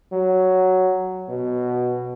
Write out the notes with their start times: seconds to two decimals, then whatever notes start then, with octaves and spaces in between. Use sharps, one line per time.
0.12 F#3
1.29 B2